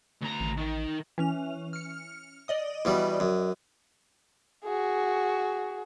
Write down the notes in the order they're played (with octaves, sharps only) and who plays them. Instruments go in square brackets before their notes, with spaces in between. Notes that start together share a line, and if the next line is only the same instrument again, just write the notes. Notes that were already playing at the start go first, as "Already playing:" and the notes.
[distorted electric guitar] D2 A#5
[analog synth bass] A1
[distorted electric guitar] D#3
[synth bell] E3 C#4 F7
F6 C#7
D5 D#5 D#6
[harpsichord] E2 B2 G3
F#2
[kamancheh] F#4 G#4